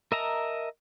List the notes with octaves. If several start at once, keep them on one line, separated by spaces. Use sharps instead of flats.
A#4 D#5 E5 A5 A#5